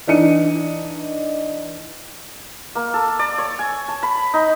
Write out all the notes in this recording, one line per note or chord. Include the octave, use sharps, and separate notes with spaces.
E3 D4 D#4 C#7 D#7
A#3
A4
D5
C#5
G#5
A5
B5
D#4